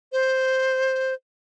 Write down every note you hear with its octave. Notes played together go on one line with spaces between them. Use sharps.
C5